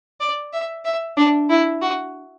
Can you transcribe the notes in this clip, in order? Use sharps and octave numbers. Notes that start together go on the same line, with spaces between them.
D5
E5
E5
D4
E4
F#4